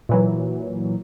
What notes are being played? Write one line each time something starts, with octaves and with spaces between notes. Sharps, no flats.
A#2 E3 F#3